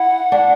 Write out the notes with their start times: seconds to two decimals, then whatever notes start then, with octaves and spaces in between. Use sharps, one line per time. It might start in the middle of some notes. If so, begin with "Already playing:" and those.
Already playing: E4 F#5
0.32 D4